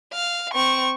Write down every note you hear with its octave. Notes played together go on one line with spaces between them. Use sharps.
F5
C4 C#6